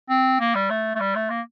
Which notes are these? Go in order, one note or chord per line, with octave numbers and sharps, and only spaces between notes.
C4
A#3
G3
A3
A3
G3
A3
A#3